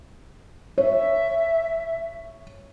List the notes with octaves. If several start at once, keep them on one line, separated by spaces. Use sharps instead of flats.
C#5 E5